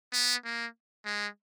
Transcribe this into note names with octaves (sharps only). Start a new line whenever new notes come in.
B3
A#3
G#3